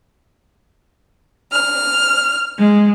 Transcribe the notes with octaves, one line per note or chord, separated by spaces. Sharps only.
F6
G#3